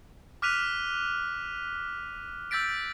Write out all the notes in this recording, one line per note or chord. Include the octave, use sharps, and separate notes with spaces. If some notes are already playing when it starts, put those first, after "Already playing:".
D6 F6 F#6 B6 D#7 F7
E6 G6 A6 B6 D7